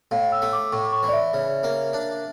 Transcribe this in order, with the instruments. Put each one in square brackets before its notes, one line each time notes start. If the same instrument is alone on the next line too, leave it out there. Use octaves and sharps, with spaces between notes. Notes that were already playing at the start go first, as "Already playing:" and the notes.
[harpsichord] A2 [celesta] F5
[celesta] E6
[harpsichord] A3
[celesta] D6
[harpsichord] A2 [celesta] C#6
[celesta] C#6
[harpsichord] E3
[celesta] D5
E5
[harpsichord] C#3
A#3
D4